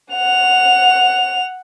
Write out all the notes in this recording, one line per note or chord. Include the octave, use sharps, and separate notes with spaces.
F#5 F7